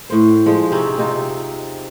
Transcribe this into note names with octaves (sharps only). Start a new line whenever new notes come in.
A2 C5
F3 G#3
C3 C4 C#4 D#4
C3 D#4 F4